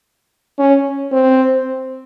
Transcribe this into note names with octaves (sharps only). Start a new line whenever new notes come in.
C#4
C4